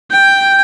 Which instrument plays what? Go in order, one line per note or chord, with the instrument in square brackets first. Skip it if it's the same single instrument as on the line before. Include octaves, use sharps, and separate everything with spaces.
[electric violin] G5